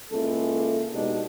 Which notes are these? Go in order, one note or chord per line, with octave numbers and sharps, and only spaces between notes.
C#2 A#3 E4 A4
B2 G#3 B3 D4 D#4 G4